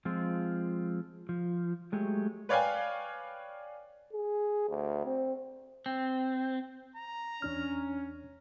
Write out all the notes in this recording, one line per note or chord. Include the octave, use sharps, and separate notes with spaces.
F3 G#3 C4 F4
F3
F#3 G#3 A3 G4
B4 C#5 D5 F5 G5 G#5
G#4
D2
C4
C4
A#5
E2 C#4 D4 F6